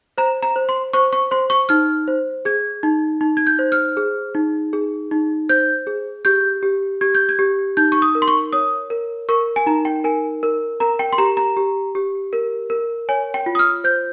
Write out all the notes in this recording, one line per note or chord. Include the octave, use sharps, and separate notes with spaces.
C5 A#5
A#5
C5
C6
C5 C#6
C#6
C5 C6
C#6
D#4 F6
C5
G#4 G#6
D#4
D#4
G#6
G6
C5
F6
G#4
D#4
G#4
D#4
C5 G6
G#4
G4 G6
G4
G4 G#6
G6
G#6
G4
D#4 G6
C#6
D#6
A#4
C6
C#6
C#5 D#6
A#4
A#4 C#6
G#5
D#4 A#5
G5
A#4 G#5
A#4
A#4 A#5
G5
C6
G4 A#5
A#5
G4
G4
A#4
A#4
C#5 G#5
G5
F4
D#6
F6
C5 G6